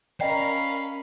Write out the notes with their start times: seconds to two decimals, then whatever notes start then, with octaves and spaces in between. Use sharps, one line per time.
0.21 C#4 A#4 D5 D#5 F5 G5 B5